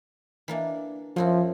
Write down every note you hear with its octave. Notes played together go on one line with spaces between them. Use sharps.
E3 A#3 D4
F#2 F3 E4 F#4